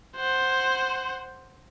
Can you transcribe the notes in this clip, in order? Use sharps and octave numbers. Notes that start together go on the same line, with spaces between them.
C5 F#5